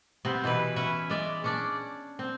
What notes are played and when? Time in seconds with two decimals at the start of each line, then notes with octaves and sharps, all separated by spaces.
0.25 C3 B3 C4
0.44 B2 E3 E4 B4
0.76 C#4 B4 E5
1.10 G#3 D5 E5
1.44 C#4 D4 D5
2.19 C4